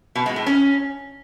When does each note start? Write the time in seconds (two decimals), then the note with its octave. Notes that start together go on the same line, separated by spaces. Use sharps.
0.15 B2
0.26 G#3
0.36 A2
0.46 C#4